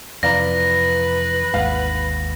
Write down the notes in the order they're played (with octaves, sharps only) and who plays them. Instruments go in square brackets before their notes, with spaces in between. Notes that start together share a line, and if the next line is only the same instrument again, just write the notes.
[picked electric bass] F2 C3 E3 [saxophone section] B4 [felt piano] D5 F5 A#5 [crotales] A#6
[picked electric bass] G#1 D#2 G#2 [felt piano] F5 F#5